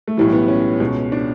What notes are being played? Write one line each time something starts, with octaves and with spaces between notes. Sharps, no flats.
A3
B1 A2 E3 G3
B3
C#4
C#2 B2
D4